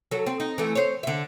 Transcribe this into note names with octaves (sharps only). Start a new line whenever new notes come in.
F#3 A4
C4
D#4
E3 A3
C5 C#5
D3 E5